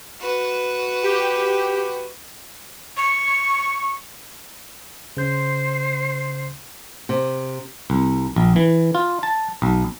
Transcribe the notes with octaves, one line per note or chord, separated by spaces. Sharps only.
F#4 B4
G4
C#6
C#3 C5 G6
C3
C2
A#1
E3
F4
A5
B1